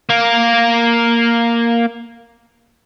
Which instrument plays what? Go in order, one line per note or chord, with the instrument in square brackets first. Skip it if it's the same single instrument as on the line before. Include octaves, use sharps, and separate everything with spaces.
[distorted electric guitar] A#3 A#4